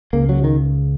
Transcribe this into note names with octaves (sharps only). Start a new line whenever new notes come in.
C#2 C#3 A#3
F#3
D#3